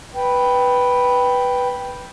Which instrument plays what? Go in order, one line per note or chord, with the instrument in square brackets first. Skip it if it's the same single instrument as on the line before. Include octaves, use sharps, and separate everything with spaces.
[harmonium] B4 G5